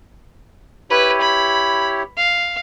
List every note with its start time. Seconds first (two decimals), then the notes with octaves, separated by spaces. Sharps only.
0.90 E4 G4 B4 C#5
1.21 B5
2.17 F5